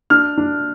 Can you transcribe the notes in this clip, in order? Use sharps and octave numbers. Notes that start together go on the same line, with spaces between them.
D4 F6
D4